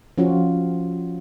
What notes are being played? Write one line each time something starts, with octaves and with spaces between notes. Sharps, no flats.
F3 C#4 F4 F#4